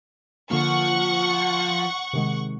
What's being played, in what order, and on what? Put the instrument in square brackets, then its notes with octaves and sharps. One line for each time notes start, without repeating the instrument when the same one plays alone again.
[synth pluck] D3 A#3 [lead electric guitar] F3 [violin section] F#5 C#6
[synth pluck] C3 D#3 G#3